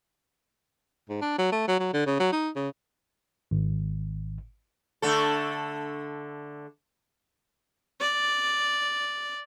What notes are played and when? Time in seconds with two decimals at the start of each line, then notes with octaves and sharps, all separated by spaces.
1.09 G#2
1.22 D4
1.39 F#3
1.52 A3
1.68 F#3
1.79 F#3
1.94 D3
2.07 C#3
2.20 F#3
2.32 D#4
2.56 C#3
3.51 G#1
5.02 D3 A3 A4
8.01 D5